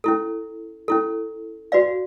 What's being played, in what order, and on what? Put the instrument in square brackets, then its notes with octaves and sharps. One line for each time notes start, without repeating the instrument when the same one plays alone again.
[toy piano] C#4 E4 A4
C#4 E4 A4
F#4 B4 D5 F5